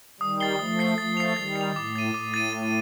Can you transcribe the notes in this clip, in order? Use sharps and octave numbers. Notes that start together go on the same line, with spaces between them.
D#3 G3 D#6
A6 C7 G7
F3 A3 D#6
A6 C7 G7
F3 A3 A6
C7 F7
D#3 G3 A6
C7
F7
A2 D6
A6 D#7
A2 D6
A6 D#7
A6